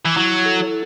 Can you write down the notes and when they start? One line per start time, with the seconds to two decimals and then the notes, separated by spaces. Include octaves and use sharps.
0.05 E3
0.16 F#3 E4
0.45 A4